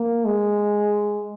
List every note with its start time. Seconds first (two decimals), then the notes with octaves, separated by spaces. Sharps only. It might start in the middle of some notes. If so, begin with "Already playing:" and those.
Already playing: A#3
0.25 G#3